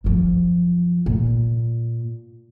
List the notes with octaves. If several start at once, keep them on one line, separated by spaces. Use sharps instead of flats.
F#2 F3
A#2